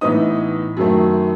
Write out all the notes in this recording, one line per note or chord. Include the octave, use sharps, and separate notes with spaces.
A2 E3 B3 D#4 D#6
F#2 D#3 A3